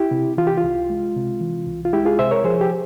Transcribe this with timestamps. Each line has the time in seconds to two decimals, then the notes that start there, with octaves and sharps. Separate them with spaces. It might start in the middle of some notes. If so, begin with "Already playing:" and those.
Already playing: E4 G4
0.11 C3
0.37 E3 F4
0.47 G4
0.58 F4
0.64 C2
0.90 G#3
1.16 C3
1.41 E3
1.66 C2
1.85 F4
1.93 G#3 E4 G4
2.06 F4 G#4
2.19 C3 C5 E5
2.31 A#4 C#5
2.44 F3 G#4 C5
2.61 G4